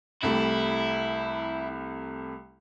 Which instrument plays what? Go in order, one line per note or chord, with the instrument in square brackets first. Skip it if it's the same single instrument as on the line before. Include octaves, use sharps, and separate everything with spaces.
[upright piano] C2 A3 G4 [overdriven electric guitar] E4